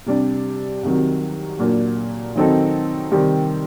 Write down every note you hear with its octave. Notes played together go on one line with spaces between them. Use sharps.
C3 G3 D4
C2 C3 D#3 F#3
A#2 F#3 A#3 D4
D#3 F#3 C4 D#4 A4
C3 D#3 G3 C4 G4